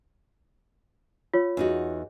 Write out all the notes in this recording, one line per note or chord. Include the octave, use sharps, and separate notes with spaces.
F4 C#5
E2 D#4 F#4